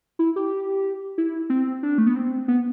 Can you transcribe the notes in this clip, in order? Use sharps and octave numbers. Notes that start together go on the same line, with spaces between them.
E4
G4
E4
C4
D4
A3
B3
C4
B3